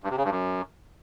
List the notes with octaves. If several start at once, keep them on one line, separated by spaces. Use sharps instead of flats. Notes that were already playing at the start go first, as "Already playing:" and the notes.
G2
C3
C#3
G2
F#2